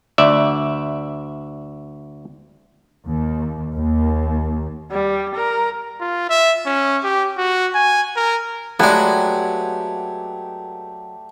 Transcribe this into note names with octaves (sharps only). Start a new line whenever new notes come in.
D2 D5 E5
D#2
D#2
G3
A#4
F4
E5
C#4
G4
F#4
G#5
A#4
F#3 G#3 A3 B3 G4 D5 A#5